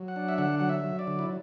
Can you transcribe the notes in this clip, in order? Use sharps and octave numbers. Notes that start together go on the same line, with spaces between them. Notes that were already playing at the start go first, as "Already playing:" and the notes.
Already playing: F#3
F#5
D4
E5
D3 F#5
F#3 F#5
E5
F#3
D5
D3
E4